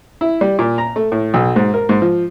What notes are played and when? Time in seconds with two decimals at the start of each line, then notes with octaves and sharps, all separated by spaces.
0.21 E4
0.41 G3
0.59 A#2
0.78 A#5
0.96 A3
1.12 A2
1.34 B1
1.56 G#2
1.74 A#4
1.89 G#2
2.02 F3